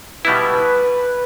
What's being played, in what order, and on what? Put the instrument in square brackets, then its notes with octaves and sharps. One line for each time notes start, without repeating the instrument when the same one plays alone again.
[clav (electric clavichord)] B2 G3 B3 E4 [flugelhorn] B4